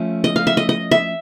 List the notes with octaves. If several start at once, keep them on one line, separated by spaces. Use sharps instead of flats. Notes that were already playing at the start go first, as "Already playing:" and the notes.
Already playing: F3 A3 C#4 E5
D#5
F5
E5
D#5
D#5
E5